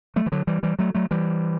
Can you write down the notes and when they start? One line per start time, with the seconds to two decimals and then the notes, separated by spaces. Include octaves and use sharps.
0.16 F#3 A3
0.26 E3
0.32 D3 F#3
0.47 E3 G3
0.63 E3 G3
0.79 F#3 A3
0.94 F#3 A3
1.11 E3 G3